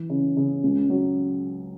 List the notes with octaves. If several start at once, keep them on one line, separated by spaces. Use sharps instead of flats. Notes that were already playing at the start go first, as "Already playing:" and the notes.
Already playing: E3
C#3
C#3
C#2
F#3